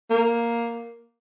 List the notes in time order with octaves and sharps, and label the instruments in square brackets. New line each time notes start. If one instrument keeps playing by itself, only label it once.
[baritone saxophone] A#3